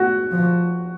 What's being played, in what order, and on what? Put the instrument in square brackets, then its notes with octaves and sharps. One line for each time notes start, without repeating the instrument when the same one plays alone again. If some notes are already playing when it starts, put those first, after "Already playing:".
Already playing: [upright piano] F#4
[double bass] F3